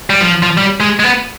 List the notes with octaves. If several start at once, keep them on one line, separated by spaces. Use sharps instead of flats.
G3
F3
F3
G3
G#3
G#3
B3